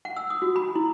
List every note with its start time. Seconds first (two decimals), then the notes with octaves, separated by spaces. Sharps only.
0.05 F#5
0.17 E6
0.30 D#6
0.42 F#4
0.56 B5
0.76 E4